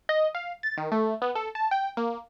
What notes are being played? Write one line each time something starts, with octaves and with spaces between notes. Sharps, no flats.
D#5
F5
A6
D#3
A3
B3
A4
A5
G5
A#3